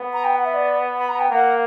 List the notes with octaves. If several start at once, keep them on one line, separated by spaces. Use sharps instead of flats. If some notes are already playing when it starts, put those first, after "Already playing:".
Already playing: B3
A#5
G5
F#5
E5
D5
B5
A#5
G5
A#3 F#5